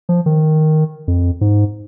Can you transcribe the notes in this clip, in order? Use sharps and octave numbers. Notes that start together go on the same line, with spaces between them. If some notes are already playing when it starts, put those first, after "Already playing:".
F3
D#3
F2
G#2